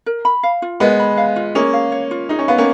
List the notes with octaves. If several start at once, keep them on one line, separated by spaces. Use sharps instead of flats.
A#4
B5
F5
F4
G#3 B3 A#4
B5
F5
F4
A#3 C#4 G#4
F5
C#5
F4
D#4 G#4
C#4
B3 F5
A#3 C#4